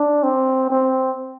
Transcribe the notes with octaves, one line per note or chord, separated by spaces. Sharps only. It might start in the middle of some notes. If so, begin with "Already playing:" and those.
Already playing: D4
C4
C4